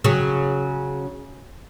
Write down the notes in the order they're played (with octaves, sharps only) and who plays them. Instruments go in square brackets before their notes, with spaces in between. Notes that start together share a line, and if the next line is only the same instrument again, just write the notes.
[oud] C#3 F#3